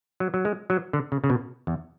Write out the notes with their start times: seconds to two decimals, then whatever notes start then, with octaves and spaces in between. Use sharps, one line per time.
0.20 F#3
0.34 F#3
0.45 G#3
0.70 F#3
0.93 D3
1.12 C#3
1.24 C#3
1.30 B2
1.67 E2